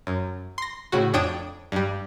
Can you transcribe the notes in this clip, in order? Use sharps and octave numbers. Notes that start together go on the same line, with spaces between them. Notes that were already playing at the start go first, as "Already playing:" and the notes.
F#2
C6 A#6
A2 C#3 F#4
F2 D4 C#5 G5 D#6 D7
G2 G3